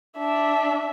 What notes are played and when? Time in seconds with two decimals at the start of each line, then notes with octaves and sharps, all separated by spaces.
0.19 D4 E5